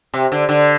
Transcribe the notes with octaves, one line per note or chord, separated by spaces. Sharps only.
C3
D3
D3